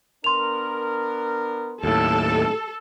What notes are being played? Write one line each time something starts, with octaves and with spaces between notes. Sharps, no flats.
B3 D4 A#4 C6 F7
D#2 A2 A4